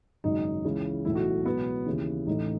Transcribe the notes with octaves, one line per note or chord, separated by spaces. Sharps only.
G#1 F#2 C#3 D#4
C#2 C#3 E3
B1 A2 E3 E4
F#4
C#2 B2 F#3 B3
D#2 C#3 E3
A1 A2 E3 D#4